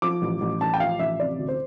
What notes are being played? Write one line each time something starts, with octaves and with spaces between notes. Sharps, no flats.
F3 D6
A1
A1
A1 A5
G5
F3 F5
A1 E5
C3 D5
D2
C5